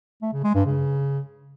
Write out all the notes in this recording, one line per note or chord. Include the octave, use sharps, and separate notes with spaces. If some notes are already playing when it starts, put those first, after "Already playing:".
A3
C#3
G#3
G2
C#3